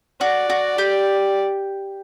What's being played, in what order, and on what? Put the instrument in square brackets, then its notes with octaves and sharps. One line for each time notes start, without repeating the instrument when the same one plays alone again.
[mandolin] F#4 [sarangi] D5
[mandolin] F#4
G4